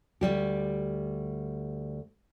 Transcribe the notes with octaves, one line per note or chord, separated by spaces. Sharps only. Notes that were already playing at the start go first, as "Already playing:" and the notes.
D2 G2 G3 G4